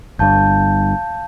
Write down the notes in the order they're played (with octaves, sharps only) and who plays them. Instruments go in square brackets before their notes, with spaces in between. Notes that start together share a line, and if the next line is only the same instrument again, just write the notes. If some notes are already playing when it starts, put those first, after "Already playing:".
[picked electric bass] G1 G2 [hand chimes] F5 A5 G6